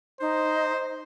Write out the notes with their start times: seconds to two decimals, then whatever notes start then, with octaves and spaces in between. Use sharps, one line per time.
0.21 D#4 C5